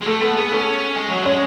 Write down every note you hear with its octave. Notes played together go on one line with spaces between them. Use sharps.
G#3
A3 A4
B3 A4
B3 G#4
C#4 A4
G#3
F#3
G#3 C#4 C#5